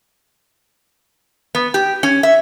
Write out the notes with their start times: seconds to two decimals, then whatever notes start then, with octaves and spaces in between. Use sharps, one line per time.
1.55 B3
1.74 G4
2.03 C#4
2.23 E5